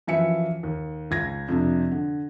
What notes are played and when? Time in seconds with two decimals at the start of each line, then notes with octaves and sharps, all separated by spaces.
0.07 F#2 E3 F3 E5 C#7
0.63 D#2
1.11 C#2 G#6 A#6
1.48 F2 C3 D4
1.91 D3